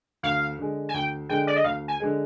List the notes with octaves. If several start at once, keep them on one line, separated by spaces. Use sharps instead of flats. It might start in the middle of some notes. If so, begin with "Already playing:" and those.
D2 F5
D3 G#3
G#5
D2 G5
D3 G#3 G5
D5
D#5
D2 F5
G#5
D3 G#3